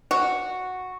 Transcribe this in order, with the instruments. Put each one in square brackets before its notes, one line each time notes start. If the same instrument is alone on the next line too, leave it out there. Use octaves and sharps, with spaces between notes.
[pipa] F#4